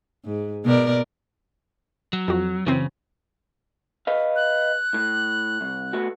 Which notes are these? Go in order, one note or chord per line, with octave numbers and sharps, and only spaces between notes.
G#2
B2 A#4 D5
F#3
F2 F#4
F#2 C#3 E3 C4
B4 D#5 F5
F#6
A2
C2
A3 B3 F#4